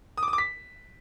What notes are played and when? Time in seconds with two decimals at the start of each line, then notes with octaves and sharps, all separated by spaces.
0.17 D#6
0.23 D6
0.28 D#6
0.33 D6
0.38 B6